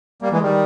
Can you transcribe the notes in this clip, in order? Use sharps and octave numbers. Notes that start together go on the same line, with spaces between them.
G3 A#3
E3 G#3
D#3 G3